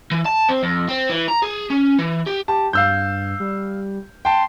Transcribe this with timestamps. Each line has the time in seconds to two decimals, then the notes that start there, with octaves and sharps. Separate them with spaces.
0.11 E3
0.26 A5
0.49 C4
0.63 F2
0.89 C4
1.10 E3
1.28 A#5
1.43 G#4
1.70 C#4
1.99 E3
2.27 G4
2.48 G4 A5
2.73 G2 F5 E6 G6
3.40 G3
4.25 G5 A5 C6